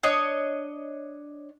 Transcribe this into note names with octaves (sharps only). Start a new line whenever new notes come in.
D4 C#5 D#5